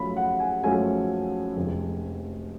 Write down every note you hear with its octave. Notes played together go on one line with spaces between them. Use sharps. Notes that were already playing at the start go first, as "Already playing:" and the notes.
Already playing: F#2 F3 A3 C#4 B5
F#5
G#5
F#2 F3 A3 C#4 G#5
F1 F2 F3 G#3